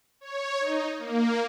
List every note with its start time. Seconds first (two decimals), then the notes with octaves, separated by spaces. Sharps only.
0.21 C#5
0.60 D#4
0.98 A#3